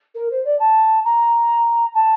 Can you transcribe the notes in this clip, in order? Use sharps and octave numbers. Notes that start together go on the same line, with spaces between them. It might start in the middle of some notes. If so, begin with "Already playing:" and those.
A#4
C5
D5
A5
A#5
A5